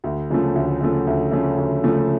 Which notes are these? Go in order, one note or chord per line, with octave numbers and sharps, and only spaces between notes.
D2
C#3 F3 A3
D2
C#3 F3 A3
D2
C#3 F3 A3
D2
C#3 F3 A3